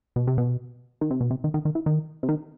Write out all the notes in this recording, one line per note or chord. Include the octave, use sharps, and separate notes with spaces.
B2
C3
B2
D#3
C3
B2
C3
D#3
D#3
D#3
E3
D#3
C3
D#3